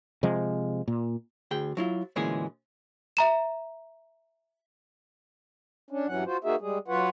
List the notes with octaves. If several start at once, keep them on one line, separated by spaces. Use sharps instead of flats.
C3 F3 G#3
A#2
D2 G#4 G5
F#3 E4 F4
D2 A#2 E3 G#3 C#4 G#4
E5 A#5 E7
C#4 D4
G2 E3 F#3 C#4 F#5
F4 F#4 C5
A#3 D#4 F#4 G#4 E5
G3 G#3 G#4
F#3 F4 B4 C#5 F#5